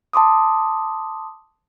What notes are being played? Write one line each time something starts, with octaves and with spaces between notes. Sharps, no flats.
A5 C6 D6 D#6